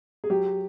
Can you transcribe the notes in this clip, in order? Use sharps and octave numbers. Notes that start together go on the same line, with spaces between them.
G#4
F#3 G4